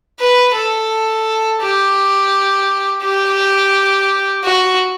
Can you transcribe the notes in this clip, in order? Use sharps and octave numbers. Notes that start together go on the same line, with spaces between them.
B4
A4
G4
G4
F#4